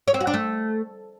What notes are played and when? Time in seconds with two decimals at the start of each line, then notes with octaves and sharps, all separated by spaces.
0.08 C#5
0.14 C4
0.21 F#4
0.27 D4
0.34 A3